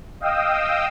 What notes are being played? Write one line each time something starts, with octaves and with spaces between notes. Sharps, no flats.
D#5 F5 G5 D#6 E6